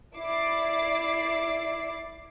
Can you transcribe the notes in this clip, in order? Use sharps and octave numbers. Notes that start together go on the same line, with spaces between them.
E4 D5 D6 C7